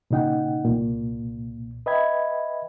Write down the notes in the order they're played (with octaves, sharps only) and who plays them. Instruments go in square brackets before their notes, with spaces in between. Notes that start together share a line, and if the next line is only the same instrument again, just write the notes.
[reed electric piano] A#2 C#3 D#4 F#5 G5
C2 A#2
B4 D#5 E5 G5 B5 G#6